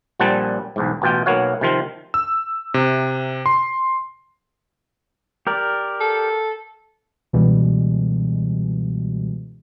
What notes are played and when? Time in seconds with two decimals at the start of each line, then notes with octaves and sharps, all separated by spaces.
0.20 A#1 A#2 G3 C4 F#5 A5
0.76 B1 E2 G#2
1.02 A1 B2 F4 G5
1.26 B1 A#3 B3 F#4 C#5 F5
1.61 C3 D#3 F3 F4
2.14 E6
2.74 C3
3.46 C6
5.47 G4 A#4 D5
6.00 A4
7.33 C#2 B2 E3 G3 G#3